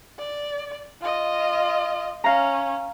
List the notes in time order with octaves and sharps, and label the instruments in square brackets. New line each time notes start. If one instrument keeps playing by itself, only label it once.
[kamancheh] D5
F4 D#5
[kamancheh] C#4 [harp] F5 A#5